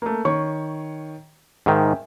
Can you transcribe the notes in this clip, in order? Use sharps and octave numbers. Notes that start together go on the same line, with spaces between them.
A3 A#3
D#3 C#5 C#6
G#2 D#3 E5 G5 G#5